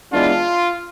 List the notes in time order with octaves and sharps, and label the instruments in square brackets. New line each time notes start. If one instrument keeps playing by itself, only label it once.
[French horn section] E3 G#3 B3 D4 [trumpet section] F4